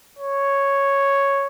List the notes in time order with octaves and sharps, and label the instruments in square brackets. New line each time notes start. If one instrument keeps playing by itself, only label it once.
[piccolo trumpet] C#5